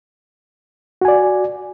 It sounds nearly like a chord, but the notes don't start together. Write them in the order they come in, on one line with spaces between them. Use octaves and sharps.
F#4 G#5 D5